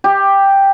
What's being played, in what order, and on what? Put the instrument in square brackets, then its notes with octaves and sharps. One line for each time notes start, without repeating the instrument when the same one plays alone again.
[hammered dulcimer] G4